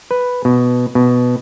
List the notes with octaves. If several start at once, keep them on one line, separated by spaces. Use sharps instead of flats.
B4
B2
B2